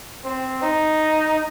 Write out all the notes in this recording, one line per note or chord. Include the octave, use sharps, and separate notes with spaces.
C4
D#4